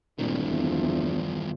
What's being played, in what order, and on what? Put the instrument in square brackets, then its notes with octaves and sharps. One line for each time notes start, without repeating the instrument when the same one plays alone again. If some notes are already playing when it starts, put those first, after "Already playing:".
[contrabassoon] D1 [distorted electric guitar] G2 D#3 [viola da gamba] A#2
[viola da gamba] E2 F3